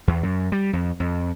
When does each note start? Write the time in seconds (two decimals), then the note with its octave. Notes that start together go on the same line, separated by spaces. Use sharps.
0.08 E2
0.23 F#2
0.52 G3
0.73 F2
1.00 F2